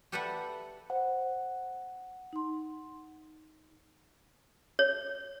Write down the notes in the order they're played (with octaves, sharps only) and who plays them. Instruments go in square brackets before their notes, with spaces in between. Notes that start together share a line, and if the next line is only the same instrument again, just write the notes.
[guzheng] G4 A4 B4 D5 E5 F#5
[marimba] C5 [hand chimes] F#5
[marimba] D#4 C6
[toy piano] C#5